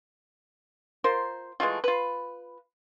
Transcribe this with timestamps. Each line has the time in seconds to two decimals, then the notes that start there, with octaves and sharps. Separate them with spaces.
1.04 F4 A#4 C5
1.60 E3 G#3 A3 F4
1.84 F4 B4